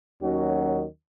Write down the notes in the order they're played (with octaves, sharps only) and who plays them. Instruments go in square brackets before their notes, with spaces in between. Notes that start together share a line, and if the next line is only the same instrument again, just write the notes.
[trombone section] D#2 D#3 F#3 C#4 F#4